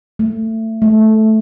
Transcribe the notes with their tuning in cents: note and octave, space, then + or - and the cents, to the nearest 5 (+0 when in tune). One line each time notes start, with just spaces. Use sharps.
A3 +20
A3 -10